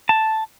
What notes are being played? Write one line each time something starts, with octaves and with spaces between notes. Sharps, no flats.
A5